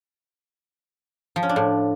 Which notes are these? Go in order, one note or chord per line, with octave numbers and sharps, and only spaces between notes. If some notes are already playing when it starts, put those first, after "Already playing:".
F3
C#4
D4
A2